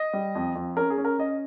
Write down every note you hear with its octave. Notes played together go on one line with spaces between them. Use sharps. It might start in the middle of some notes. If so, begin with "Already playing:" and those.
Already playing: D#5
G3
F2
F2
C#4 A#4
G#4
C#4
A#4
C#4 D#5